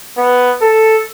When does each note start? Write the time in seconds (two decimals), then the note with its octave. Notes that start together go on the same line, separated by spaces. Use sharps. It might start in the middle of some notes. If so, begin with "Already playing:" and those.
0.17 B3
0.62 A4